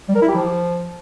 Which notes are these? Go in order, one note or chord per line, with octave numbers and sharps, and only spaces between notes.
G3
A#4
E4
G4
F3